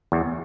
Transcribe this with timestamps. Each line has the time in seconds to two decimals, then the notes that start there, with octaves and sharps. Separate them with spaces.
0.12 E2